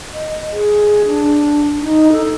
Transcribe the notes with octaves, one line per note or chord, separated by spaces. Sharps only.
D#5
G#4
D4
D#4
A4